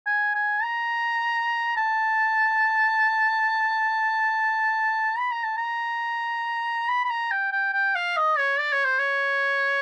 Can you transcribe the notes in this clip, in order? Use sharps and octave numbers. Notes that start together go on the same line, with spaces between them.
G#5
G#5
A#5
A5
B5
A#5
A5
A#5
B5
B5
A#5
G5
G5
G5
F5
D#5
C#5
D5
C#5
C5
C#5